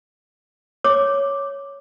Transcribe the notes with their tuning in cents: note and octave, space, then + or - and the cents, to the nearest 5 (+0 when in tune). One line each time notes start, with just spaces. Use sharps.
C#5 +0 D6 +0